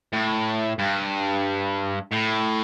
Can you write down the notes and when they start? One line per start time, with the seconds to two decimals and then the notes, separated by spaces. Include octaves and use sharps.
0.13 A2
0.79 G2
2.12 A2